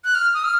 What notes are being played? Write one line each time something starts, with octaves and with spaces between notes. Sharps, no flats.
F#6
F6
D#6
F6